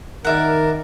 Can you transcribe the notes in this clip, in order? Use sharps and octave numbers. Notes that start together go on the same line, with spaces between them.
D#3 A#4 D5 E5 F#5